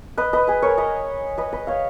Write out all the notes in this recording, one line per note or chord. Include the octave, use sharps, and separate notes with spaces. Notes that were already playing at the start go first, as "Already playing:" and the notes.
B4 D#5
B4 D#5
G#4 B4
A#4 C#5
B4 D#5
B4 D#5
B4 D#5
C#5 F5